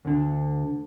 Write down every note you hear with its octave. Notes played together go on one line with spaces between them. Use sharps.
D2 D3